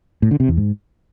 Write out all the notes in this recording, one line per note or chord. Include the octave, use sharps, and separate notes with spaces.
A2
D3
C3
E2
G#2